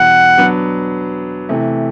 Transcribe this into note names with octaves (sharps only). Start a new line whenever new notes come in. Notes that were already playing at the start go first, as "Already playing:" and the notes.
Already playing: E2 B2 G3 F#5
F#3 B3 D4
C3 E3 A3